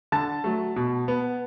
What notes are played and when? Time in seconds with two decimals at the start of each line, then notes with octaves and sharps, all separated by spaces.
0.12 D3 A5 A6
0.44 F#3 A3
0.76 B2
1.08 B3